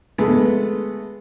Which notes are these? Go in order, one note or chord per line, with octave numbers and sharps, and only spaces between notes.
G#3 A3 B3